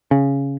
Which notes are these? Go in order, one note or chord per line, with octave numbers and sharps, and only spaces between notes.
C#3